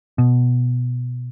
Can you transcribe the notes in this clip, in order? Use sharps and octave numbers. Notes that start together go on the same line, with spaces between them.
B2